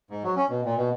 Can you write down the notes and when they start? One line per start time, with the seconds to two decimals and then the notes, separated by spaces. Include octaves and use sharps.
0.10 G#2
0.23 F#3
0.36 C#4
0.50 B2
0.65 A#2
0.78 B2